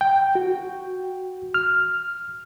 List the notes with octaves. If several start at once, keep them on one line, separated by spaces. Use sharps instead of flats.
G5
F#4
F6